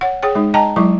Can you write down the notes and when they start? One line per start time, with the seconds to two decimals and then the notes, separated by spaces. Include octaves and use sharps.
0.01 C#5 F#5
0.23 G#4 C#5 G5
0.35 G#3 D#4
0.54 D#5 G5 A5 A#5
0.76 F#3 G#3 E4 C#6